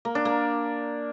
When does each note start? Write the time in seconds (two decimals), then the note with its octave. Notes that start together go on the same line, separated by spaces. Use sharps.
0.05 A#3
0.15 D4
0.25 A#3